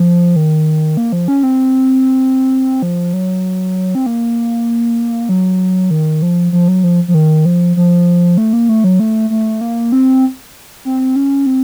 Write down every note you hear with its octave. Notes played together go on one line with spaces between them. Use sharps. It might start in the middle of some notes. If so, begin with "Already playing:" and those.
Already playing: F3
D#3
A#3
F3
C#4
C4
F3
F#3
C4
A#3
F#3
D#3
F3
F3
F#3
F3
F3
D#3
F3
F3
A3
A#3
A3
F#3
A3
A3
A#3
C4
C4
C#4
C4